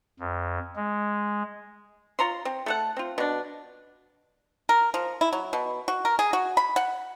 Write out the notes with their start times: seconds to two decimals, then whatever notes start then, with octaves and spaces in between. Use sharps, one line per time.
0.20 F2
0.76 G#3
2.19 F4 C#5 A#5 C6
2.45 C4
2.66 A3 A4 F#5
2.97 C4 F4
3.18 B2 D4
4.69 A#4
4.94 F3
5.21 E4
5.33 F#3
5.53 B2
5.88 F#4
6.05 A#4
6.19 G#4
6.33 F#4
6.57 B5
6.76 F#5